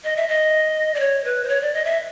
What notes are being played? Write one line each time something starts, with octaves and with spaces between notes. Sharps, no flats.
D#5
E5
D#5
D5
C#5
B4
C5
C#5
D5
D#5
E5